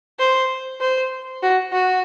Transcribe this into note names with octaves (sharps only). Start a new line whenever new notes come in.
C5
C5
F#4
F#4